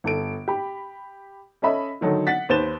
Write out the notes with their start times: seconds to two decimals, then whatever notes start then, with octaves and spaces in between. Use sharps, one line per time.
0.04 G1 A4 D7
0.48 G4 B5
1.62 C#4 A4 D#5 E5 B5
2.01 D3 D#3 F#3 D#4 A4
2.27 F#5 A6 B6
2.49 D#2 B4 C5 A6 E7 G7